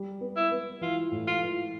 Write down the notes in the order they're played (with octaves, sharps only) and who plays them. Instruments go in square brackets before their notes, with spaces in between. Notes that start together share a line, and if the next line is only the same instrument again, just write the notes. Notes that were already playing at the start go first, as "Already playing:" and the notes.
Already playing: [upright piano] G3
B3
[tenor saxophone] E4
[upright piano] B3
[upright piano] E3 [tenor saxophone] F4
[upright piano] A2
[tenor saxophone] F4
[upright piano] E3